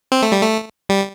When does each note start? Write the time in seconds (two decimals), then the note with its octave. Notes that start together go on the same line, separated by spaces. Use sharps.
0.12 C4
0.22 A3
0.32 G3
0.42 A3
0.89 G3